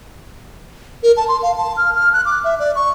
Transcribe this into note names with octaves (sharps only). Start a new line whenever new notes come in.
A#4
A5
C6
F5
A5
F6
F6
F#6
D6
E5
D5
C#6